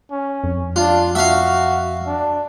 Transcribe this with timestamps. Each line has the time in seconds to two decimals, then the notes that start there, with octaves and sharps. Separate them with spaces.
0.11 C#4
0.44 F2
0.76 D4 F4
1.15 F#4 E5 F5
2.06 D4